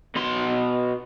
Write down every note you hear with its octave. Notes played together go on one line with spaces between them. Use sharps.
B2 C6